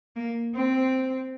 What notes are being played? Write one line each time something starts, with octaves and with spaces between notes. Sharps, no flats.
A#3
C4